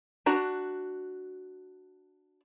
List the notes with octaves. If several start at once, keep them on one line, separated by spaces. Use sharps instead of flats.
D4 F#4 A#5